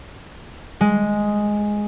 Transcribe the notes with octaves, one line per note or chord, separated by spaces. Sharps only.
G#3